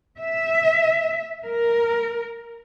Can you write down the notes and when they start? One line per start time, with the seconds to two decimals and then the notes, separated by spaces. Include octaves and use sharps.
0.18 E5
1.44 A#4